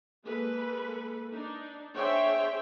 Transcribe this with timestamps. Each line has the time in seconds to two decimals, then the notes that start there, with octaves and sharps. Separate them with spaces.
0.25 G#3 A#3 A4 B4
1.33 D4 D#4
1.94 D4 G#4 C5 C#5 E5 G5